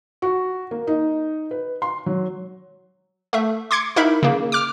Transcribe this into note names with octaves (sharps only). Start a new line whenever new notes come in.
F#4
A#3
D#4
B4
C6
F#3
A3 E5
C6 D6 G#6 C#7
D#4 E4 A#4 E5 B5
C#3 A#3
D6 F6